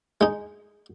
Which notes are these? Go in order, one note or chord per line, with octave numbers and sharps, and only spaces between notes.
G#3 D#4